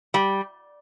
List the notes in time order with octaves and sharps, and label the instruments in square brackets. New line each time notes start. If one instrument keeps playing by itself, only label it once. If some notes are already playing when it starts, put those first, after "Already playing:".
[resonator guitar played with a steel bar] G3